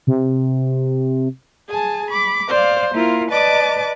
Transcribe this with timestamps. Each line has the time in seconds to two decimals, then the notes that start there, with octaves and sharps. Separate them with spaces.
0.07 C3
1.69 G#4 G#5 A5
2.09 B5 D6
2.48 C5 D5 F5
2.92 A#3 E4 F4 A#4
3.30 B4 D5 D#5 A5 D6 A6